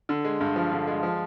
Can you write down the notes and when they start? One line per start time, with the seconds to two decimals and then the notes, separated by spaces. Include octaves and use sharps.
0.09 D3
0.25 G#3
0.41 G2
0.56 F3
0.72 D3
0.88 G#3
1.03 F3